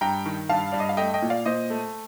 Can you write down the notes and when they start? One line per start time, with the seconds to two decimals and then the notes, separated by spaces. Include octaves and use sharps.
0.01 G2 G5 A#5
0.26 D#3
0.49 G2 F5 A5
0.72 G2 D5
0.80 D#5
0.89 F5
0.97 A3 D#5 G5
1.14 D#5 G5
1.22 A#2
1.30 D5 F5
1.46 A#2 C5 D#5
1.70 A3